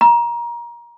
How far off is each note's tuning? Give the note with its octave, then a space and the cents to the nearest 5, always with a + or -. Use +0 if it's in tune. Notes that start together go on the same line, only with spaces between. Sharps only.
A#5 +25